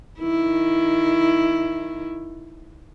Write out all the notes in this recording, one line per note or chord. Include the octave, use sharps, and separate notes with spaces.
D#3 E4